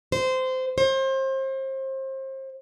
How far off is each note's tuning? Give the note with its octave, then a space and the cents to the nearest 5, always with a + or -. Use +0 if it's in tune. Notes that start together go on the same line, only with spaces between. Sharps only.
C5 -20
C5 +30